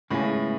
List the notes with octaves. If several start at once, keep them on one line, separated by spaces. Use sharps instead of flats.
A2 C#3 G#3 B3 F4 G#4